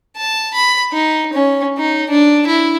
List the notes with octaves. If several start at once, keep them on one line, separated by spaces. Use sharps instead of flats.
A5
B5
D#4
C#4
D#4
D4
E4